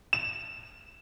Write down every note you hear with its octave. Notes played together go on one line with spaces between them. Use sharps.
E7